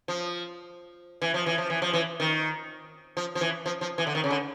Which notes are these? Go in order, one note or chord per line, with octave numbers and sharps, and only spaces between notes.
F3
E3
F3
E3
F3
E3
F3
E3
D#3
F3
F3
E3
F3
F3
E3
D3
D#3
C#3
D3